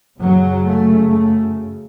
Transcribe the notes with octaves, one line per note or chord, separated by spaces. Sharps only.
F#2 C#3 F#3
A3
A3